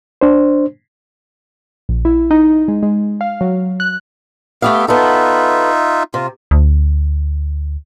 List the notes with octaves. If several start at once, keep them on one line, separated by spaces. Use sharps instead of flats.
D4 C5
A#1
E4
D#4
G#3
G#3
F5
F#3
F#6
A3 B3 G4 E5 F5
B3 D#4 F4 A4 E5
C3 F4
D2